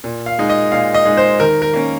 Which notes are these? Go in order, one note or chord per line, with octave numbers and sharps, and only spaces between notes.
A#2
F5
G#3 D#4
D#5
A#2 F5
D#5
G#3 D#4
C5
D#3 A#4
A#4
A#3 C#4